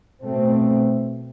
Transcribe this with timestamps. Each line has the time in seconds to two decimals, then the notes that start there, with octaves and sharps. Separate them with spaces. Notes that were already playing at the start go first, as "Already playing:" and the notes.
0.22 B2 A3 C4